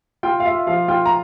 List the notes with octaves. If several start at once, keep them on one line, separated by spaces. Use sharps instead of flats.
F4 G5
F5
F4 E5
F3 F5
F4 G5
A#5